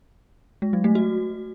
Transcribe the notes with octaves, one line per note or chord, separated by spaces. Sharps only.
G#3
F#3
A3
F#4